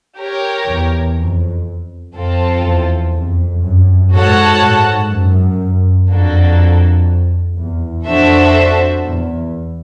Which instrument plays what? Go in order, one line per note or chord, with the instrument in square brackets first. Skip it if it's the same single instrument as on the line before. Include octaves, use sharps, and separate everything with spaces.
[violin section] G4 A#4 C#5
[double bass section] E2
F2
[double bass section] F2 [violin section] C4 F4 A4
[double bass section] E2
F2
F#2
[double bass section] G#2 [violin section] F#4 A4 C#5 F#5 A5
[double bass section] G#2
F#2
[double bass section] F2 [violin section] A#3 D4 F#4 A4
[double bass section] E2
[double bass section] F2 [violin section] D4 F#4 A4 C5 E5
[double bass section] E2